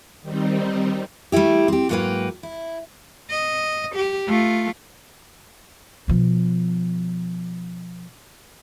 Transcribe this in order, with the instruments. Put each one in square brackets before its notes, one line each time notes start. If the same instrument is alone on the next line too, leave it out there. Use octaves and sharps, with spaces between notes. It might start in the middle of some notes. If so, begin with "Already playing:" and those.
[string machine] D#3 G3 C4 D#4
[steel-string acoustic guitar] G3 A3 A#3 E4 G4
C4 G4
G#2 F#3 A#3 G4 B4 G5
E4
[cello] D#5
G4
A3 F4
[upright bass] B2 F3